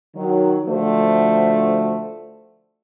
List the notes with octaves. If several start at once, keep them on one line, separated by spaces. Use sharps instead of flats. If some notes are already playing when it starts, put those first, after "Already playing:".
D#3 F#3
D3 F3 A3 F#4 A4 C5